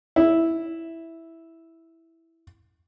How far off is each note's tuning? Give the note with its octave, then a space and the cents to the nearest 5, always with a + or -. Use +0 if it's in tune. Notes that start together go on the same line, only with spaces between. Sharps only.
E4 -5